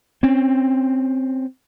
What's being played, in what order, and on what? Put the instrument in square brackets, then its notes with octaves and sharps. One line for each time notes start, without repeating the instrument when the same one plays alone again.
[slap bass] C4 C#4